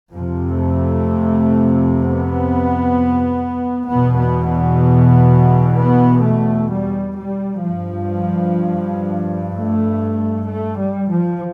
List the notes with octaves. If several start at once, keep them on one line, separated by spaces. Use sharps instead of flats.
F2 C3 F3
A3
B3
E2 B2 B3
B3
B3
B3
A3
G3
G3
G2 F3
A3
A3
G3
F3